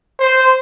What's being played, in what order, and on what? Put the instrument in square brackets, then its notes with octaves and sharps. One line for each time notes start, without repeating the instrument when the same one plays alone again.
[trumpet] C5